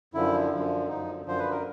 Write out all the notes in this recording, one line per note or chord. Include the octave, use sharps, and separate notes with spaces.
F#2 D3 F3 E4
F#2 D3 F3
F#2 D3 F3 D#4
F#2 D3 F3 C5
B4
A#4